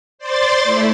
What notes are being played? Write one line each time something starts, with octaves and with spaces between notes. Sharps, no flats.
C5 D5 C6 A6
A3 E4